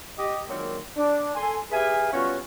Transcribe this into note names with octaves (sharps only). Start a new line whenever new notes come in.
G4 D#5
A#2 D#3 F#3 G#3 A#3 C4
D4
A4 G#5 C6
G4 G#4 B4 E5 F5 G#5
G3 B3 C#4 F4 F#4 C#5